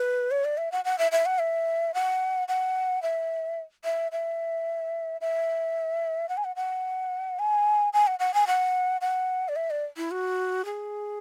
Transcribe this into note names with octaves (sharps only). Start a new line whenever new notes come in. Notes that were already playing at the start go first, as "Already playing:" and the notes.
Already playing: B4
C#5
D5
E5
F#5
F#5
E5
E5
F#5
E5
F#5
F#5
E5
E5
E5
E5
F#5
G#5
F#5
F#5
G#5
G#5
F#5
F#5
G#5
F#5
F#5
D5
E5
D5
E4
F#4
G#4